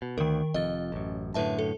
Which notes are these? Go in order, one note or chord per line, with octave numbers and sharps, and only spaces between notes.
B2
D2 D#3 A#4
F1 F2 D#5 A6
A1 F#2
F#2 A2 D3 B4 E5 A5
A4